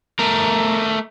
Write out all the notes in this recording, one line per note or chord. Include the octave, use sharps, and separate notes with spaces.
A3 A#4